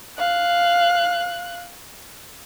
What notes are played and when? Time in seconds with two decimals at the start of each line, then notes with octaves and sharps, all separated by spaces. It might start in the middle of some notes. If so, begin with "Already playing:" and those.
0.18 F5 F#6